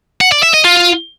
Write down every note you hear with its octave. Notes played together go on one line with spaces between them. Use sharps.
F#5
D5
E5
D#5
F4